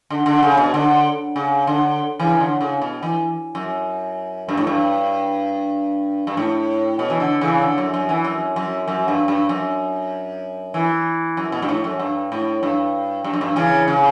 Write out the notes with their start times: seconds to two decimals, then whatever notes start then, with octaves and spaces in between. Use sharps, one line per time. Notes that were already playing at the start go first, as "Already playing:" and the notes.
0.10 D3
0.26 D3
0.43 C#3
0.57 B2
0.74 D3
1.36 C#3
1.67 D3
2.19 C#3 E3
2.40 D3
2.61 C#3
2.82 B2
3.03 E3
3.55 F#2
4.49 G2
4.57 A2
4.67 G2
6.27 G2
6.37 A2
6.99 B2
7.10 E3
7.20 D3
7.41 C#3 E3
7.62 D3
7.78 F#2
7.94 F#2
8.09 E3
8.25 F#2
8.56 F#2
8.88 F#2
9.08 G2
9.28 G2
9.49 F#2
10.74 E3
11.37 F#2
11.52 B2
11.62 G2
11.69 A2
11.84 F#2
11.99 G2
12.32 A2
12.63 G2
13.24 G2
13.33 F#2
13.41 G2
13.56 C#3 E3
13.88 C#3